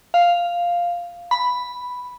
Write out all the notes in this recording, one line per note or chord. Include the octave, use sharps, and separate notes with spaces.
F5
B5